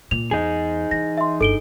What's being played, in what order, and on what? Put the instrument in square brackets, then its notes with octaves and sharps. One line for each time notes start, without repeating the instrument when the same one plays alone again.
[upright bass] A#2 [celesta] F7
[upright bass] E2 [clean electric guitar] D#4 G#4
[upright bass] E3 [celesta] A#6
[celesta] E5 C6
[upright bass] G1 [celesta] A4 D7 G7